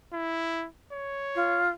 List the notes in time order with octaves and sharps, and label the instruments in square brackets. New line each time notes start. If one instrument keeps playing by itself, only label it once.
[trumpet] E4
C#5
[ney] F4